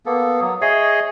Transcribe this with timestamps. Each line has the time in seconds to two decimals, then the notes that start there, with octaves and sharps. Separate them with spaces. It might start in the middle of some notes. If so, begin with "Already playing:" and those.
0.06 A#3 B3 A4
0.41 F#3 D#6
0.61 G#4 C#5 D#5 E5 G#6 C7